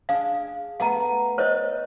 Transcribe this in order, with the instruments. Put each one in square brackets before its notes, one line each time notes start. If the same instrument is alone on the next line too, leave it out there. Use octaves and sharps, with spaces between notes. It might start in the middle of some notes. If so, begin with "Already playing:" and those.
[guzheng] D4 G#4 [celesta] F5
[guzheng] A3 B3 [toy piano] F#5 A#5
[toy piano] C5 C#5 D#5